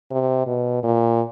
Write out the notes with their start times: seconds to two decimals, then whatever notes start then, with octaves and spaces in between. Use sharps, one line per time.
0.11 C3
0.47 B2
0.83 A#2